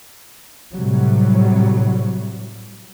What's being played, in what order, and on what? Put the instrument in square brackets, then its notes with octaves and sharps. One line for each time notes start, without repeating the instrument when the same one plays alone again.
[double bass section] A2 C3 F#3 G3